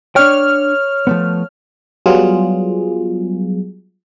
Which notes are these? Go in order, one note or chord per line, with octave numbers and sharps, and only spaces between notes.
D4 C#5 G5 F6
F3 A3 B3
F#3 G3 B3 F4 G#4